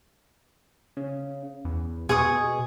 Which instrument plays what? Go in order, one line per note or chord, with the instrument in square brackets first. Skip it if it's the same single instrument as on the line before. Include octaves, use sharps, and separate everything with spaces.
[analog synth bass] C#3
E2
[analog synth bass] B2 [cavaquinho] G#4 C#6 D#6